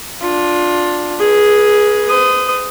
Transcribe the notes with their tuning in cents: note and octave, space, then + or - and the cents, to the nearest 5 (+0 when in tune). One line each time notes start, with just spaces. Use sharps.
D4 +0 F4 +15
G#4 +0 B4 -35
C5 -45 D#6 +0